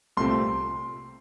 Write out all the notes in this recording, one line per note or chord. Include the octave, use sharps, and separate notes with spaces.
C2 A#2 A3 C4 C6